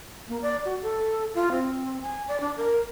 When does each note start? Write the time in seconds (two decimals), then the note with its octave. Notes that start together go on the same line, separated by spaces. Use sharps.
0.28 A#3
0.42 D5
0.65 F#4
0.82 A4
1.34 F4
1.52 C4
2.02 G#5
2.28 D5
2.40 D4
2.57 A#4